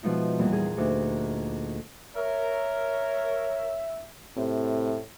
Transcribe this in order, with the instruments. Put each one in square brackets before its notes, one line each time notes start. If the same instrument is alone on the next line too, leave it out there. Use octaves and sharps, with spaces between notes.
[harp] B2 F3 G#3 D#4 E4
E2 A#2 G3 A#3 A#5
D#4 G#4
D2 D#4 A#4 D6
[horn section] A#4 [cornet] C#5 [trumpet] E5
[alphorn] A2 [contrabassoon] C3